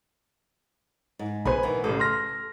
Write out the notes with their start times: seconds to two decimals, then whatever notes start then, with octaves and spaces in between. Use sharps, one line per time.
1.19 G#2
1.45 B1 D#4 G#4 B4 C5 G#5 B5
1.63 D#3 E3 B3
1.84 A1 C#3 A4
1.99 C6 F6 A#6